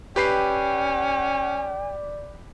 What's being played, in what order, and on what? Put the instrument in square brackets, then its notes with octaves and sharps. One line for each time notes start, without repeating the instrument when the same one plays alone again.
[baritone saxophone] C#4 [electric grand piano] G4 B4 C7 [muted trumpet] D5 [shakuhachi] G5